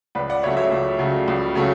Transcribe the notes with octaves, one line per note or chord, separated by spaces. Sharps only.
C#2 B4 D5
D5 F#5
C#3 F#3 A3 C#5 E5
C#5 E5
C#2
C#3 F#3 A3
C#2
C#3 F#3 A3